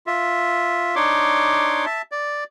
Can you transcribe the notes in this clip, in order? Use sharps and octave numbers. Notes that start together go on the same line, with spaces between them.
F4 E5
D4 D#4 C#5 C6 D6
E5 A5
D5